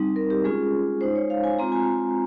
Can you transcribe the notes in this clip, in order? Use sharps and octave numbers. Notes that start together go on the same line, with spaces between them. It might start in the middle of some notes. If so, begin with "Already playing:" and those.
Already playing: G3 C4 D#4
A#4
G4
G#3 C#4 F4 G#4
G#3 D#4 C5
C#5
F5
G#5
G#3 C4 F4 A#5
G#5